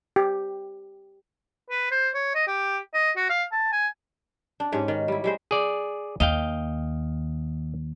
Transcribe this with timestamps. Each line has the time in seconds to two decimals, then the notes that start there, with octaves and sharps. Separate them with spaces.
0.16 G4
1.70 B4
1.91 C5
2.14 C#5
2.35 D#5
2.47 G4
2.94 D#5
3.16 F#4
3.30 F5
3.52 A5
3.72 G#5
4.60 D4
4.72 G#2 C#4 G4
4.88 D#3
5.08 G3 E4
5.24 G3 G#3 C5
5.51 G#4 D5
6.20 D#2 D#5 F5 G5